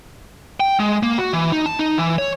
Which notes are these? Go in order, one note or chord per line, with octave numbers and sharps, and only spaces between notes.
G5
G#3
A#3
F#4
E3
D#4
A5
D#4
E3
C#5